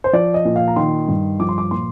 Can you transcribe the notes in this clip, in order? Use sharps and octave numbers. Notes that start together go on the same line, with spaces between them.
C5
F3 D5
D#5
A#2
F5
A#5
D#3 C6
G2
F3 D6
C6
D6
A#2 C6